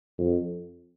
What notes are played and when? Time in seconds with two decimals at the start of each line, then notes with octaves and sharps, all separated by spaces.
0.18 F2